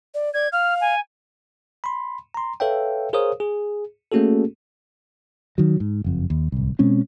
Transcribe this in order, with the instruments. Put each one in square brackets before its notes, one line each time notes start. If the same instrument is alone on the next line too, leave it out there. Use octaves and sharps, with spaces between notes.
[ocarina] D5
[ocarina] D5 [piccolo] G#6
[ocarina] F5 [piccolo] F6
[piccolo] G#5
[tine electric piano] B5 C6
A#5 C6
A4 B4 C#5 E5 F5 G5
G#4 A#4 C5 C#5 F5 D#6
G#4
A3 A#3 C#4 F#4 G#4 A4
[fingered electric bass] D#3 F#3
G#2
F#1 F2
D#2
D1 C2
B2 G#3 C4 C#4